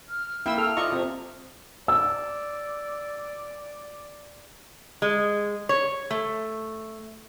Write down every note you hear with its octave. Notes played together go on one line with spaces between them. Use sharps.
F6
A#3 E4 E5 G5 B5 E6
A4 E6 F6
E4 F4 D5 D#5 A#5 C#6 D#6
F2 C3
D5 E6
G#3
C#5
A3